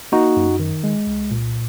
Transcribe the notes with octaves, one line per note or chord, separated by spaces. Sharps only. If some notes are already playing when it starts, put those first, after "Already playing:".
A#3 D#4 F#4
F#2
D#3
G#3
C2
A#2